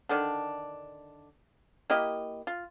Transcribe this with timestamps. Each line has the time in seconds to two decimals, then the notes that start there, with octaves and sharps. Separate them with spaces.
0.09 D3 D#3 D4
1.90 A#3 E4 G4 D#5
2.47 F4